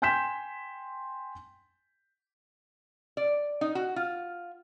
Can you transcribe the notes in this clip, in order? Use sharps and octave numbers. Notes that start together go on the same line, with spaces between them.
G5 G#5 C6 G6 B6 E7
D5
D#4
F#4
F4